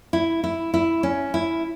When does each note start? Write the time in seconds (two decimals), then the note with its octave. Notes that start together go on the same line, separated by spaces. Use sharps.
0.13 E4
0.44 E4
0.74 E4
1.03 C#4
1.34 E4